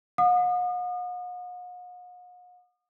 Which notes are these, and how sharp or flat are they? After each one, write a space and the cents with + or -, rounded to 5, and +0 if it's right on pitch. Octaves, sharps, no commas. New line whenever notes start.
F#5 -45 D#6 -35